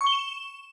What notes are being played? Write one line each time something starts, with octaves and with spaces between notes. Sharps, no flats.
C#6
G7
E7